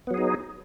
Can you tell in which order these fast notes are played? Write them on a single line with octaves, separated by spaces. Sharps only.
B3 F#3 G#4 D#4